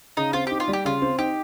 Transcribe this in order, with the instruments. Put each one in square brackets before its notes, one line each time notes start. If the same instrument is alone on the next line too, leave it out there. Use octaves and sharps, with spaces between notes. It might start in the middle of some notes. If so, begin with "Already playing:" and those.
[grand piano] C#3 [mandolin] D#4
[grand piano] C4 [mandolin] F4
[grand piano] D#4 [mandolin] G4
[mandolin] F4
[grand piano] G3
[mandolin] G4
[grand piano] C#3 [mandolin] F4
[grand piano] C4
[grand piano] D#4 [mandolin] G4